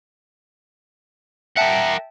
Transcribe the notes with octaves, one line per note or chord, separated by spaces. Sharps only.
A#4 E5 F#5 G5 A5